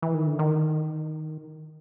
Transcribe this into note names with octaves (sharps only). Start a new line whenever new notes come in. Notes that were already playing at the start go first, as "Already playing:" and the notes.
E3
D#3
D3
D#3